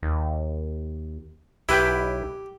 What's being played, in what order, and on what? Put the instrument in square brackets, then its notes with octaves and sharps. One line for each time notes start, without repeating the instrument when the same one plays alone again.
[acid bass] D#2
[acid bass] B1 [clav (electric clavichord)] E4 B4 G5 [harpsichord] G4